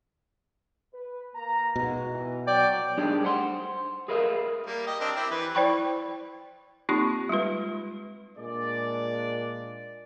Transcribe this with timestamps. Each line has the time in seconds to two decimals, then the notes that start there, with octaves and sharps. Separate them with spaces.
0.94 B4
1.35 A#3 A#5
1.76 B2 G#3 D#4 F#4
2.10 E3
2.47 F#3 D5 G5
2.98 G3 D4 D#4 G4 G#4 D5
3.24 C5 F#5 C6
4.08 G#4 A#4 B4 C#5 E5 F5
4.66 G3 A#3
4.87 G4 D#5
5.00 C4 D4 A#4
5.16 C4 E4 G4
5.31 E3 B4
5.55 E4 C5 D5 G5 B5 C#6
6.89 A#3 C4 D#4 F4 G4 C#6
7.29 G3 G#3 F4 B4
8.37 A#2 G#3 D4 D5